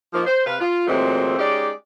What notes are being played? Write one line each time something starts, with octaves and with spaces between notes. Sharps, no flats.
F3 A#3 D#4
C5
C3 B4 F5
F4
A#2 E3 F#3 G#3 A3 C4
G#3 C#4 D#4 G4 D5